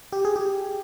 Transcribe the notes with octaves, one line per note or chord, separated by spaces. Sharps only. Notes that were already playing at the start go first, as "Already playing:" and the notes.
G4
G#4
G4